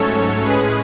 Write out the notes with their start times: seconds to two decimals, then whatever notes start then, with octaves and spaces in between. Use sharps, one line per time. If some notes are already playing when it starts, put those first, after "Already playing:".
Already playing: G#2 F#3 A3 C#4 A4 C#5
0.43 A2 G#3 C#4 G#4 B4